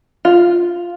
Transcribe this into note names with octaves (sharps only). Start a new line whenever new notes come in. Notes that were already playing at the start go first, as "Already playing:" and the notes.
F4